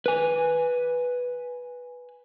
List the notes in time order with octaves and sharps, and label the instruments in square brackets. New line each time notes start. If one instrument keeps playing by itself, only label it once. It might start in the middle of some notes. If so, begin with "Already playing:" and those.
[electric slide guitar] B4 G#5